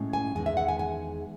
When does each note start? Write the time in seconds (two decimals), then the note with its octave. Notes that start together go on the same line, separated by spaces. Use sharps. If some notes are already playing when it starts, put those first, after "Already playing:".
Already playing: A2 G#3 C#4
0.13 G#5
0.35 E2 D#3 G#3 G#5
0.46 E5
0.57 F#5
0.68 G#5
0.79 G#5